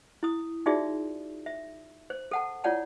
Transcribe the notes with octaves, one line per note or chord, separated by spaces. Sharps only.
E4 D#6
D#4 F4 F#4 G#4 D5 E5
E5
C5
A4 F#5 A5
E4 F4 C#5 D5 F#5 A5